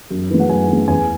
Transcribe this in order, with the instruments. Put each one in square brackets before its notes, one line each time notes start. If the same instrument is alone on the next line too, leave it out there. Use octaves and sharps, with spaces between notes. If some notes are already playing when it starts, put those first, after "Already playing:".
[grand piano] F#2
E3 A3
F#5
F#2 G#5
E3 A3
E2 G#5